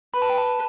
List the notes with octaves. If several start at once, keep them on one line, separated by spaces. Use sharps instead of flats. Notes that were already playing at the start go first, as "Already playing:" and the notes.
B4 B5
A5
G5
A5